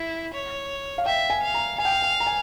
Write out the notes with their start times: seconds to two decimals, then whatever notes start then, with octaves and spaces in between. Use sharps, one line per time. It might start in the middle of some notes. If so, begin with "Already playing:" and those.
Already playing: E4
0.34 C#5
0.98 F5
1.06 E5 G5
1.30 G#5
1.43 F5
1.54 A#5
1.78 F5 G#5
1.85 G5
1.92 G#5
2.02 G#5
2.20 A#5
2.27 G#5